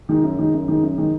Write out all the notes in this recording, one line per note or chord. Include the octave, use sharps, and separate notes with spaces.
D#3 G#3 D#4
F#2
D#3 G#3 D#4
F#2
D#3 G#3 D#4
F#2
D#3 G#3 D#4